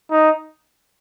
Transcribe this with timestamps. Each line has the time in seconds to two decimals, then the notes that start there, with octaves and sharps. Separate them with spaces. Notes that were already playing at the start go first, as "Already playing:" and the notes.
0.11 D#4